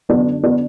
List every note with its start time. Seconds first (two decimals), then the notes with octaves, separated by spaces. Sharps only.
0.09 F#2 D3 B3 D4
0.44 B3 D4